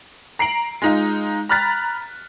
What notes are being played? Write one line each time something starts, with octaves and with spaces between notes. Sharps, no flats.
A#5 C7 D7 F#7
G#3 D#4 F4
A#5 B5 F6 F#6 A6 B6